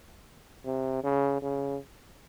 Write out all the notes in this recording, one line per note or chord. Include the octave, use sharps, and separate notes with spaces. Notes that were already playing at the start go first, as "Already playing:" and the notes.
C3
C#3
C#3